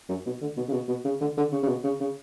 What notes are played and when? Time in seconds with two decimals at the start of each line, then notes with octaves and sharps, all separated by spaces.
0.09 F#2
0.26 B2
0.41 D3
0.57 B2
0.69 C#3
0.73 B2
0.89 B2
1.05 C#3
1.21 D3
1.37 D3
1.52 C#3
1.63 C#3
1.68 B2
1.84 C#3
2.00 C#3